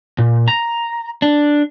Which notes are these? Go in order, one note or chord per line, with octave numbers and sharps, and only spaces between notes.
A#2
A#5
D4